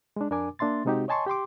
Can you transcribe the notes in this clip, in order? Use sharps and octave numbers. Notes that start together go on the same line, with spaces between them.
G#3 D4
F2 D4 A#4 G#5 D6
A#3 D4 E5 C6 A6
C3 G#3 C4 D#4 F#4 G4
C#5 D#5 G#5 A5 C6 C#6
G4 G5 C6 D6